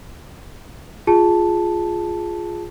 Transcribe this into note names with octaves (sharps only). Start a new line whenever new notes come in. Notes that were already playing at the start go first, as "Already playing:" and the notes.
F4 G#4 A5